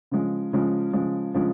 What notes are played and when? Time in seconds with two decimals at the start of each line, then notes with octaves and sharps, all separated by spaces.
0.11 C#3 F3 G#3
0.53 C#3 F3 G#3
0.93 C#3 F3 G#3
1.34 C#3 F3 G#3